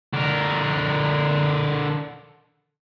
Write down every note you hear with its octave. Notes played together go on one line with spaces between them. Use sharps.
D3 A#4